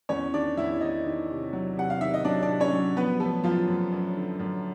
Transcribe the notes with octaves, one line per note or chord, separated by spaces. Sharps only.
E2 C#4 C#5
D#3 D4 D5
E2 E4 E5
D#3 D#4 D#5
D#3
C3
F#3
C3 F#5
F5
D#3 E5
D#5
F#3 D4 D5
D4 D5
C3
C#4 C#5
F#3
F3 B3 B4
F3 A3 A4
F#2 F3 F4
F#2
F#2
D3
F#2